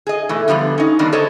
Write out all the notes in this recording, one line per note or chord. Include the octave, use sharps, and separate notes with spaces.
G#4 D#5
B2 E3 A3
D3 F3 G3 A#3 B3
C#4 D#4
D3 D#3 G3 A#3 B3 D4
A4 A#4 C5 C#5 D#5